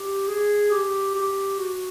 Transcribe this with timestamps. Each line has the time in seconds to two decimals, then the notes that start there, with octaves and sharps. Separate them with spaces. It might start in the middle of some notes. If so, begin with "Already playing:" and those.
Already playing: G4
0.28 G#4
0.71 G4
1.15 G4
1.59 F#4